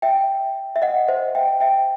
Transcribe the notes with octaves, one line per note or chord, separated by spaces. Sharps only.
E5 G5
E5
D#5 F#5
C5 E5
E5 G5
E5 G5